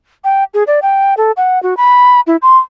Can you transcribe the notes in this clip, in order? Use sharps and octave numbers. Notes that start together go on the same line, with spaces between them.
G5
G#4
D5
G5
A4
F#5
F#4
B5
E4
C6